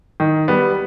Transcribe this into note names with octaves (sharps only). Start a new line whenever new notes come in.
D#3
G3 B3